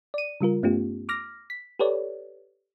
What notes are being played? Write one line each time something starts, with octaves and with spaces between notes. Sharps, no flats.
D5 D#7
C#3 G3 F4 A#4
G2 A3 B3 C#4 F4 G4
D6 F6 A#6
B6
G4 A4 B4 C#5 D5